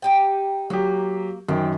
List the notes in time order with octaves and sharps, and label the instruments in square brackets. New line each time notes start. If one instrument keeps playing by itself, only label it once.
[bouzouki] D#4 G4 G5
[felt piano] F#3 G4 [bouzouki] A#3
[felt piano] F#2 D#3 [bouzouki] C4